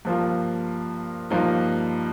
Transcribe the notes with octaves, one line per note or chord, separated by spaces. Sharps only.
G2 F3 A#3
G2 F3 A#3 D#4